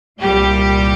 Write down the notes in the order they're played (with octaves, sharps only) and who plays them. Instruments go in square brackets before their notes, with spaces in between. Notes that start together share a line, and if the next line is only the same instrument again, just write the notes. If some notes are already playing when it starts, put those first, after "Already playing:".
[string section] C2 A#2 G3 G4